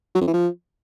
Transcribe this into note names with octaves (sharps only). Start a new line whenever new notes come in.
F#3
F2
E3
F3